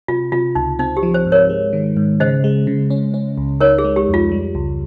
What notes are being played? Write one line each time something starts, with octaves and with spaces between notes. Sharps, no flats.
C3 F4
C3 F4
C#2 D#4
C4 D#4
G4
F3
C5
G#2
A#4 C#5
G#3
D#3
G#2
C#3 C5 D#5
G#3
C#3
C#4
C#4
C#2
D#4 A#4 C#5
G#4
G#3
G4
F2
F4
G3
C#2